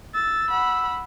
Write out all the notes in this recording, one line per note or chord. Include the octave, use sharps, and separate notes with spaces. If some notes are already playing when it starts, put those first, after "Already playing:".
E6 A6
F#5 B5